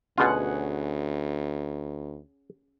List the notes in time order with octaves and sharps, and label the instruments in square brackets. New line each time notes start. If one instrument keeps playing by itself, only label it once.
[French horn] D2 [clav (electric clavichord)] B2 F4 [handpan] C#4 G#4 F#5